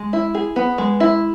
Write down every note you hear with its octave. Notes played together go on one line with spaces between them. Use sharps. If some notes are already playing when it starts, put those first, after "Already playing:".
Already playing: G#3
E4
G#4
B3
G#3
E4